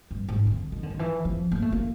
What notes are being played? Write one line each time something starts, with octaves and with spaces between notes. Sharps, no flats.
G2
G#2
D3
D#3
D3
D#3
E3
F3
A#3
A3
A#3